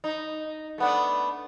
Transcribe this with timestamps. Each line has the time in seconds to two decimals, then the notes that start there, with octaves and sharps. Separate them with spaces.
0.04 D#4
0.78 A3 B3 D4